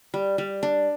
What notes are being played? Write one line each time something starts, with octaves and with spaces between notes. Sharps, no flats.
G3
G3
D4